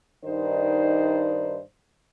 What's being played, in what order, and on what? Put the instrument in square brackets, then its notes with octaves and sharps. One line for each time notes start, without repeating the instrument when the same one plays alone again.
[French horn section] G2 D#3 D#4 C5 D5